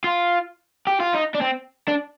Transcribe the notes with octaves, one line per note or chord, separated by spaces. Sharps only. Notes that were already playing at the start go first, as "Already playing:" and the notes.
F4
G4
F4
D#4
D4
C4
D4